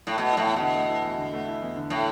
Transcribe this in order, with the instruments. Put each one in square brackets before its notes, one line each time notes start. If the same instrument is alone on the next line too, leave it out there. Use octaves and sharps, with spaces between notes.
[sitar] A2
[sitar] B2 [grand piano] A3
[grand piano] E4
[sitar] A2
[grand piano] E2
[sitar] B2 [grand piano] D3
[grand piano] A3
E4
E2
D3
A3
E4
E2
D3
[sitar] A2 [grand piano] A3